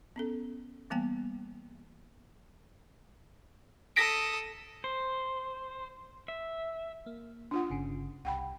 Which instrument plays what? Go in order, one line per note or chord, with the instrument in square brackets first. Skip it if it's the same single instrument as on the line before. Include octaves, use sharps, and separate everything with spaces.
[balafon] B3 C#4 A4
E3 G3 A#3 B3 G5 G#5
[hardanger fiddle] A4 D#6 [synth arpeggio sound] A#6 B6 D7
[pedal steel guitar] C5
E5
[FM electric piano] A#3
[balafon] D4 F4 F#5
[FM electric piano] G1 C#3
[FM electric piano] C2 [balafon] F#5 G5 B5